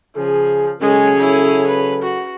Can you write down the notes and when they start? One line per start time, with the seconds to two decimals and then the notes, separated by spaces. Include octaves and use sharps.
0.16 C#3 F3 G#4
0.81 C#3 F#3 G#3 C#4 G#4 A4 C#5
1.18 E4
1.67 B4
2.02 F#4